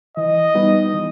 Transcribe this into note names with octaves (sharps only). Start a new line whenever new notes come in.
E3 D#5
G3 B3 D#4
E3